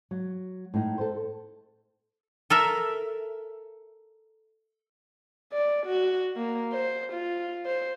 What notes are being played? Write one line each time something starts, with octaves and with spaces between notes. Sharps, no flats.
F#3
A2 D#4
A4 C5
A4 A#4 E5
D5
F#4
A#3
C5
F4
C5